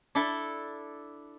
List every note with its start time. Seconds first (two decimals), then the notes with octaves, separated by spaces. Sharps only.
0.15 D4 E4 A4 E5